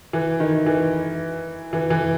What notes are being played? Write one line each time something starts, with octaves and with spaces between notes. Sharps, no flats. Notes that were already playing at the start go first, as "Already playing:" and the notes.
E3
D#3
E3
E3
E3